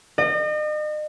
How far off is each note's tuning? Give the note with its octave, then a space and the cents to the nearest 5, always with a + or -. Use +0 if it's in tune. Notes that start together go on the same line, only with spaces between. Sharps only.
D#5 -40